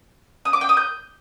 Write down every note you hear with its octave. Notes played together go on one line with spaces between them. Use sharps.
D#6
D6
G5
D#6
G6